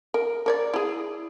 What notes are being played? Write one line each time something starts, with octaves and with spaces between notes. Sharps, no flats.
A#4
A#4 C#5 D5
E4 G#4